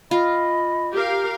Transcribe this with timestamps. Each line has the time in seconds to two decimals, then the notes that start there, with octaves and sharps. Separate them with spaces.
0.11 F4 D#5 B5
0.93 G4 A#4 F5